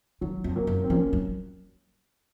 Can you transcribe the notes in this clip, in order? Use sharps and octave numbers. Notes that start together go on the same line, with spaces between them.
D#3 F#3
F2
F#3 A#3
F#2
C4
F3 A#3 C#4
F#3